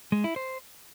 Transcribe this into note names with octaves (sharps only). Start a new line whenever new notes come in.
G#3
E4
C5